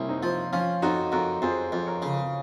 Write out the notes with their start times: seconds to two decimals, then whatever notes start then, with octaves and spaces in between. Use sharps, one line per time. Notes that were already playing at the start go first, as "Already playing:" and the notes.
Already playing: C2 A#3 C#4
0.08 C4 D#4
0.23 F3
0.52 F3 C#4 F4
0.82 F2 D#4 F#4
1.12 F2 F#4 A#4
1.42 F2 G#4 C5
1.72 F2
1.86 A#4 C#5
2.02 C#3